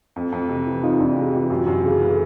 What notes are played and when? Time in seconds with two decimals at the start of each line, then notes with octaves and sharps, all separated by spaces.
0.16 F2
0.32 F2
0.49 C3
0.67 E3
0.83 F2 D#4 F4
0.99 F2 D4 E4
1.16 C3 F#4 G#4
1.33 E3 F4 G4
1.50 F#2 F4 G4
1.66 F#2
1.83 C#3 F#4 G#4
2.01 E3
2.10 A4